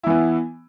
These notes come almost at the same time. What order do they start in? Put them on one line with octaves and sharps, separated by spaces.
E4 E3 B3